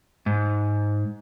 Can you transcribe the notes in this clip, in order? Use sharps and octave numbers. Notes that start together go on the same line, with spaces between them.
G#2